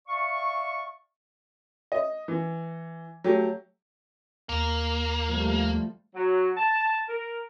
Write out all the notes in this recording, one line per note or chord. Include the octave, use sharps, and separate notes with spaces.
D5 E5 F5 C#6
D#5
E3
F#3 A3 G4
D#2 A#3
F3 G3 A3
F#3
A5
A#4